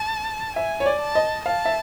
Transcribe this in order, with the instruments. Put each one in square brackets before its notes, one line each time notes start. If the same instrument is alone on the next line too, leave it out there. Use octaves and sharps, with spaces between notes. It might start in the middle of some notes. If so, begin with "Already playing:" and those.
Already playing: [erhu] A5
[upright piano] E5 [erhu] G#5
[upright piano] C#5
D5
[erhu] A5
[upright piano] D#5
[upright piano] F5 [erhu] A5
[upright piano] E5